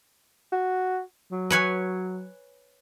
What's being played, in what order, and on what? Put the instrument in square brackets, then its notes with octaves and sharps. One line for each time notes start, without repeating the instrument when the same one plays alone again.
[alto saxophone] F#4
F#3
[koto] B4 C#5 G#5